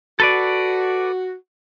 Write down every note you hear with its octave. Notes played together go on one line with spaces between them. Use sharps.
F#4 A4 B4 D5